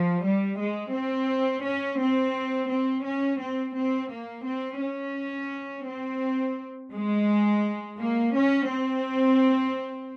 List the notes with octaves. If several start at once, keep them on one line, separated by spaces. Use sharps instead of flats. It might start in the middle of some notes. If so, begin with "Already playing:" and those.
Already playing: F3
G3
G#3
C4
C#4
C4
C4
C#4
C4
C4
A#3
C4
C#4
C4
G#3
A#3
C#4
C4